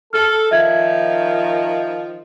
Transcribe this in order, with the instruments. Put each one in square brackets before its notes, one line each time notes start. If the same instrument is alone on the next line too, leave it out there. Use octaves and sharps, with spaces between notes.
[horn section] A4 [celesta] F6
[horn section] D#3 F3 [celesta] E5 G#6